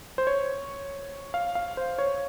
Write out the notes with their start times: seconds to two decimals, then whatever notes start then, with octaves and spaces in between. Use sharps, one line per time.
0.18 C5
0.27 C#5
1.34 F5
1.55 F5
1.77 C5
1.99 C#5